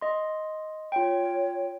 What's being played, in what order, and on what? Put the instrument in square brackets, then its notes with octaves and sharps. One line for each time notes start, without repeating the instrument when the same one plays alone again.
[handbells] D#5 C6
[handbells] F4 G5 [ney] C#5